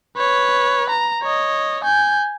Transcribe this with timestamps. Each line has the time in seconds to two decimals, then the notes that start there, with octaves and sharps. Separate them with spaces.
0.16 B4 C#5
0.90 A#5
1.22 C#5 D#5
1.84 G#5 G6